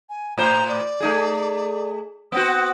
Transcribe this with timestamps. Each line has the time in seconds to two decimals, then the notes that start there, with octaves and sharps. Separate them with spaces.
0.09 G#5
0.38 A2 C5 A#5
0.69 D5
1.00 A3 D#4 G#4
2.32 B3 C4 F#4 D#6